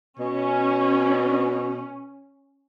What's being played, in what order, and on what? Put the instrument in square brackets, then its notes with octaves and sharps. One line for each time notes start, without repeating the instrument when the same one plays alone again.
[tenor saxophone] B2 [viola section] C#4